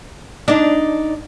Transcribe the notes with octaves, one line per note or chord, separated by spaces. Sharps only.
D4 D#4 D5